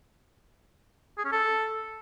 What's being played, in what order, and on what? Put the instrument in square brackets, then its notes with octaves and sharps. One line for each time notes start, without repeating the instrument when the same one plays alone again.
[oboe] G#4
C#4
A4